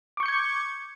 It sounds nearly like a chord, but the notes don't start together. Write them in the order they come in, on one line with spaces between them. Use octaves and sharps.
D6 C#6 G6 C#7 G#6